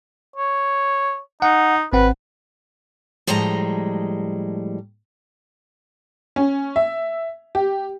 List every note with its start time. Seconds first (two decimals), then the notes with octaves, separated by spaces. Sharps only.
0.36 C#5
1.42 D#4 F#5
1.93 G#1 C4 B4 F#5
3.27 A2 F3 G3 G#3 D#5 A#5
6.36 C#4
6.76 E5
7.55 G4